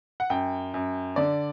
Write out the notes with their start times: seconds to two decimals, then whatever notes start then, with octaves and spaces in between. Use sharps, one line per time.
0.20 F#5
0.30 F#2 G5
0.74 F#2
1.16 D3 D5